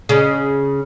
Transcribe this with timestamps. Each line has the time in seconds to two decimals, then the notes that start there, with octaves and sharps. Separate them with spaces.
0.09 C#3